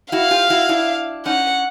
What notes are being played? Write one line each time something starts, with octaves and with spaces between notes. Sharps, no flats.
E4 F#4 F5
F4 G4
E4 F#4
D4 E4
C#4 D#4 F#5